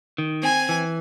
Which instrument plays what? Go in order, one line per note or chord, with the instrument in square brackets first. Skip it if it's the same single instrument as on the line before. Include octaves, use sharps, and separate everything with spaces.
[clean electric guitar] D#3
[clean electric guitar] C4 [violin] G#5
[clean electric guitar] E3